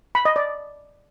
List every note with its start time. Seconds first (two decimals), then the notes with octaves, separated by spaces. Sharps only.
0.15 B5
0.25 D#5
0.36 D5